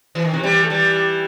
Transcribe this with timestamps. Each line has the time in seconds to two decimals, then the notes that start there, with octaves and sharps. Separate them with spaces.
0.15 E3
0.25 D#3
0.33 C3 E3
0.43 E3 G3
0.63 A3
0.70 E3 G3